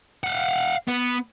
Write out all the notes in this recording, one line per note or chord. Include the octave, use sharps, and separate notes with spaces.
F5 F#5
B3